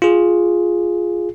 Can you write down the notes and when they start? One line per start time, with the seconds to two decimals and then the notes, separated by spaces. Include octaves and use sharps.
0.02 F4 G#4